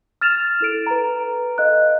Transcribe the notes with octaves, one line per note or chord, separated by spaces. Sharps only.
F6 A6 E7 F7
E4 A4 D7
B4 A#5
A4 D#5 F5 F#6